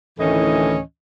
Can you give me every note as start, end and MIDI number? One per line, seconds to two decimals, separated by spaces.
0.18 0.79 38
0.18 0.79 45
0.18 0.79 51
0.18 0.79 52
0.18 0.79 61
0.18 0.79 75